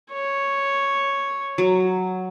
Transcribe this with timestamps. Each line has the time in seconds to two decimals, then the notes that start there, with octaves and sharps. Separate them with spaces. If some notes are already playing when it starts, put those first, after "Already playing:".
0.11 C#5
1.58 F#3